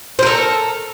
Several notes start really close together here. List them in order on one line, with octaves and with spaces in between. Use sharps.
C5 A#4 A4